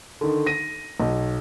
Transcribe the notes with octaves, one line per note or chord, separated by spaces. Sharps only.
D3 D#3
A#6 D#7
B1